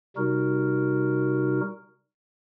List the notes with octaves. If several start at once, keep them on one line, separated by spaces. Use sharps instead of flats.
C3 G3 D#4 F#4 A#4